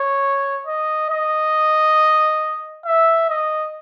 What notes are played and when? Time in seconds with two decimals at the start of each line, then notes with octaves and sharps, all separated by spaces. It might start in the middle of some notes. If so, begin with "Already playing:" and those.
Already playing: C#5
0.67 D#5
1.10 D#5
2.86 E5
3.29 D#5